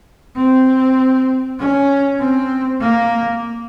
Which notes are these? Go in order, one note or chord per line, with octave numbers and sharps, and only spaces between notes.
C4
C#4
C4
A#3